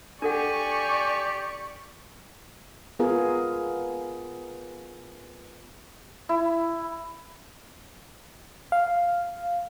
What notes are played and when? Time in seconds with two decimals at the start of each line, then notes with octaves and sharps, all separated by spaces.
0.22 D4 G4 A4 D5 F#5 G#5 C#6
2.99 B3 F4 G#4 A#4
6.29 E4
8.72 F5